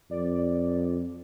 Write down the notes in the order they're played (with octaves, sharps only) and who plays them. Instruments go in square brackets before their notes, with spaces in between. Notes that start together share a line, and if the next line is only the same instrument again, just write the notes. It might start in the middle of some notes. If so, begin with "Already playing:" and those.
[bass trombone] F2 [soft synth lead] D5